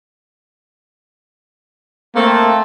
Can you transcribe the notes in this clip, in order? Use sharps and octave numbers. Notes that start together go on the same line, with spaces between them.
A3 A#3 C4